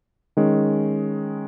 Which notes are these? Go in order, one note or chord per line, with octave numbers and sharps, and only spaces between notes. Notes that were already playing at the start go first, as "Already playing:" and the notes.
D#3 G#3 C#4